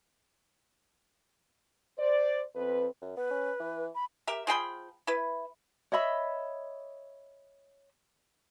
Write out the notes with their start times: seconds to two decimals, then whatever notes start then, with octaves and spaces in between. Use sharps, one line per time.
1.98 C5 D5
2.55 F2 C4 B4
3.01 F#2
3.17 B3 B4
3.31 C#4
3.60 E3
3.95 B5
4.27 G4 A#4 E5
4.47 F3 G#4 G5 B5
5.07 E4 B4
5.92 C#5 D#5 E5 B5